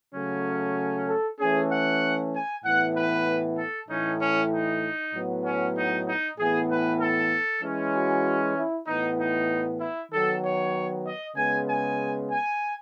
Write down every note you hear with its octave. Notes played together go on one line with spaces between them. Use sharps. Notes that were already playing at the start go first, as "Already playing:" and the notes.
C#3 F#3 A3 C#4
A4
E3 A3 C#4 G#4
F#5
G#5
A2 E3 B3 F#5
B4
A4
A2 E3 A3 C#4 D#4
C#4
D#4
A2 F#3 B3
C#4
D#4
D#4
A2 E3 B3 G#4
B4
A4
E3 G#3 C#4
F#4
E4
A2 E3 B3 D#4
D#4
E4
D#3 F#3 B3 A4
C#5
D#5
C#3 G#3 B3 G#5
G#5
G#5